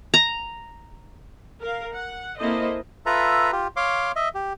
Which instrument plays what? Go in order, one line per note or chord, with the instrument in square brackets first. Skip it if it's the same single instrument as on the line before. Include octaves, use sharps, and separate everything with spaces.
[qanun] A#5
[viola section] A#4 F5
F#5
A#3 C4 E4 A4 C5 D#5
[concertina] F4 A4 B4 E5 A#5
F4 G4
C#5 F5 C6 D6
D#5 E5
G4